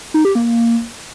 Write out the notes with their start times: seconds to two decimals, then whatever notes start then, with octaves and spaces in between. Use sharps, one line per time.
0.14 D#4
0.25 G4
0.35 A#3